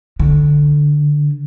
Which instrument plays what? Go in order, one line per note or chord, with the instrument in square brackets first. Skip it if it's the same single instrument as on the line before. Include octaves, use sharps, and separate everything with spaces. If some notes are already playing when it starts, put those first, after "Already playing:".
[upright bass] D3